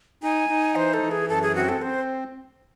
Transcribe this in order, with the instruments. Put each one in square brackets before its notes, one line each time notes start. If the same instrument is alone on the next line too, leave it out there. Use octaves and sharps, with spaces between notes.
[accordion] D#4 [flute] G#5
[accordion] D#4
[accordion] E3 [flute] C5
[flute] A4
[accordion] E3
[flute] G#4
[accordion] F#2 [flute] A4
[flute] G#4
[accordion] C4 [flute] F#4
[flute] A4
[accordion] C4 [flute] C5